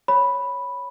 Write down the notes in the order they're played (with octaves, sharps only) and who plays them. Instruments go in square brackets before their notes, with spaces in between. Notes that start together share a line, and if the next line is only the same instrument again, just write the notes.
[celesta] C#5 B5